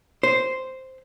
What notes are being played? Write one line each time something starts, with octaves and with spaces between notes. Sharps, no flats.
C5